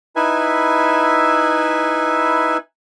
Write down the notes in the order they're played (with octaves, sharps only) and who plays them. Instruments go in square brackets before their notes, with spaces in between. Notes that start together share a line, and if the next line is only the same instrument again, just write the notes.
[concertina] D#4 E4 B4 E5 G#5